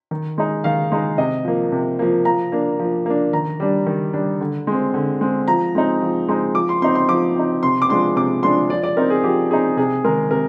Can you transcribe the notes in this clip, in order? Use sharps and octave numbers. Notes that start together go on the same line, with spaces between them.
D#3
G#3 D#4
D#3 F5
G#3 D#4
C3 D#5
F3 A#3
C3
F3 A#3
F3 A#5
A#3 D4
F3
A#3 D4
D#3 A#5
G3 D4
D#3
G3 D4
D3
G#3 C4
D3
G#3 C4
F3 A#5
G#3 C4 D#4
F3
G#3 C4 D#4
F3 D6
C6
C4 D#4 C6
C6
F3 D6
C4 D#4
C3 C6
D6
F3 G#3 D4 C6
C3 D6
F3 G#3 D4 C6
F3 D5
D5
C4 D#4 A#4
G#4
F3 G4
C4 D#4 G#4
C3 G#4
D#3 G#3 A#4
C3 A#4